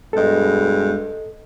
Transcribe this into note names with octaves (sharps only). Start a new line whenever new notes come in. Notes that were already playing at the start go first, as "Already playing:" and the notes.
G2 B2 G#3 A4 D#5